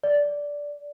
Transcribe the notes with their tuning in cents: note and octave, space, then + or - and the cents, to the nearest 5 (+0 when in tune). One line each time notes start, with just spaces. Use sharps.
D5 -10